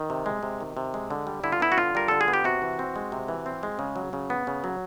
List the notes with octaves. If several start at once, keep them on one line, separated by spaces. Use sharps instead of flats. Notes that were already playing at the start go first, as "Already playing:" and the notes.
Already playing: D#3
C3
G#3
C3
D#3
C3
G#3
D3
G3
D3 E4
F4
B3 E4
F#4
D3 F4
G3 A#4
D3 A4
G#4
B3
G4
C3 F#4
E3
C4
G#3
C3
E3
C4
G#3
C#3
F#3
C#3
B3
C#3
F#3